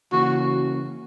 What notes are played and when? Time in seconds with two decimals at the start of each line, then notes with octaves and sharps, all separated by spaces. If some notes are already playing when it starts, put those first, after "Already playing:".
0.12 C#3 E3 A#3 C#4 F#4